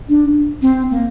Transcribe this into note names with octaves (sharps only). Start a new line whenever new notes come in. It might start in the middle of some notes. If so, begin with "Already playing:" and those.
D4
C4
A#3